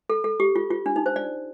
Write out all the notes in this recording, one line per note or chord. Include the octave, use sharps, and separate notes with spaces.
A4
A4
G4
F4
F4
D4
D#4
C5
D5